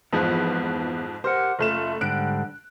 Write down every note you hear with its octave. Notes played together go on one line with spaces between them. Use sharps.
F2 G#2 E3 F3 B3 B4
G4 A#4 C5 F#5
F#1 A3 F4 E7
G#2 D3 G3 F#6 D7